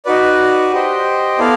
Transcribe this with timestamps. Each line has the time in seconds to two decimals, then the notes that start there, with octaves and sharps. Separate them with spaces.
0.05 D#4 F#4 B4 D5
0.72 G4 C5 D#5 G5
1.39 B3 E4 A4 D5 F5